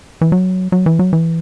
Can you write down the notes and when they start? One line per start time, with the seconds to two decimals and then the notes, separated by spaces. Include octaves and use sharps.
0.21 E3
0.32 F#3
0.72 F#3
0.86 E3
0.99 F#3
1.13 E3